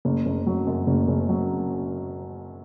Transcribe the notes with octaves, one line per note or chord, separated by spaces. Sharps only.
F#1
F#1
F#3
F#2
F#1
F#1
F#3